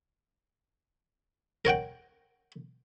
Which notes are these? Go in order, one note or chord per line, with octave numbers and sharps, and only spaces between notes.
A#4 C#5 F#5 G5